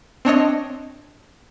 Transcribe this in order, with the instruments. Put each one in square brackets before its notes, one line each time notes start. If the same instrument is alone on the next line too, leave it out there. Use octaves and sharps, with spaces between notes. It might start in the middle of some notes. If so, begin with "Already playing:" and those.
[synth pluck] C4 D4 C#5 D#5